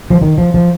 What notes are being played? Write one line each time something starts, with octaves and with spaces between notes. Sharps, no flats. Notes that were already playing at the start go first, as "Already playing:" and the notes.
F3
D#3
F3
F3